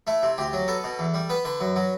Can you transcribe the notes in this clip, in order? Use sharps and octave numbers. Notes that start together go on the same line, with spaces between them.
A3 E4
C3
D2 G4
F#3
B3 A4
B2
E2
G3
B3 B4
D3 B4
F#2
F#3